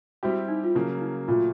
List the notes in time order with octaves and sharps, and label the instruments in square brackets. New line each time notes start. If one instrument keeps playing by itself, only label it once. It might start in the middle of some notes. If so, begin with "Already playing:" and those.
[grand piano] G3 C4 E4 G4 [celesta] F#4
[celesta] D#4
F4
[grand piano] C#3 F#3 A#3 [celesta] E4
[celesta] E4
[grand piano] A#2 F#3 A3 [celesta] F4